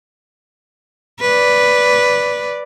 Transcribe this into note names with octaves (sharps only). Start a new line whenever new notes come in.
B4 D5